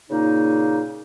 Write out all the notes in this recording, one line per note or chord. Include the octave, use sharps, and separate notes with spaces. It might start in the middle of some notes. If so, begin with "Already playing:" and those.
A#2 C#3 A#3 D#4